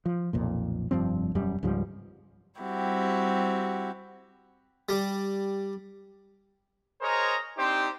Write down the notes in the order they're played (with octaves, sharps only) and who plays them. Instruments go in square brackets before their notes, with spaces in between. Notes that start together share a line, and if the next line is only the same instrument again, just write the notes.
[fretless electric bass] F3
B1 F2 A#2
F1 G2 F3 C4
E1 F#2 G3
C#2 G#2 F3 G3
[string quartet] G3 C4 E4 F#4 G4
[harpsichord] G3
[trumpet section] G#4 A#4 C5 C#5 D#5 A#5
C4 D4 D#4 G4 C5